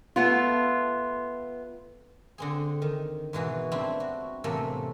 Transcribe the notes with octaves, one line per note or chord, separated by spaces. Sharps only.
A3 B3 F4
D3 C4 G#4
D#3
G#2 B2 E3 F#4
G3 C4 D4 E4
F#4
E2 A2 C3 A3 A#3 A4